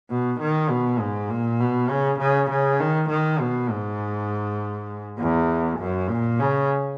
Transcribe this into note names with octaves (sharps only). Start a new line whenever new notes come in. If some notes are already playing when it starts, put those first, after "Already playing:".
B2
D#3
B2
G#2
A#2
B2
C#3
C#3
C#3
D#3
D#3
B2
G#2
E2
F#2
A#2
C#3